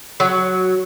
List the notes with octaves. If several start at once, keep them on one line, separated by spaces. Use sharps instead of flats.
F#3